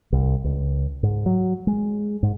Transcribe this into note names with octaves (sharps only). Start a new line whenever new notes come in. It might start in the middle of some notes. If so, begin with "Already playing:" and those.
C2
C#2
G#2
F#3
G#3
G#2